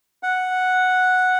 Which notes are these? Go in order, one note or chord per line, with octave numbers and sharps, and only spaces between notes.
F#5